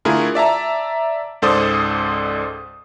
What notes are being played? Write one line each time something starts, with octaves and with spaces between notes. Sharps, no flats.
D3 A3 E4 F4 G#4 A#4
D5 E5 A5 A#5
C#2 G#2 A4 C5 D5 D#6